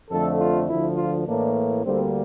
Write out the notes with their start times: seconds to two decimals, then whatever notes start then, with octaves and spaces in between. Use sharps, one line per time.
0.11 F2 D3 F3 A3 A4
0.39 F4
0.68 D2 D3 F3 E4
0.97 F4
1.26 A2 E3 A#3 D4
1.84 D2 D3 G3 A#3 C4